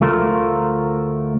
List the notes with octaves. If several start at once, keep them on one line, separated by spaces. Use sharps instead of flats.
D2 A3 F4 A#4 C5